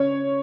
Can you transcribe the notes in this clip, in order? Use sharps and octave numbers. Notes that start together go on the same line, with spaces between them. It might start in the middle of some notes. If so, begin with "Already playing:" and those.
Already playing: C#3 C#5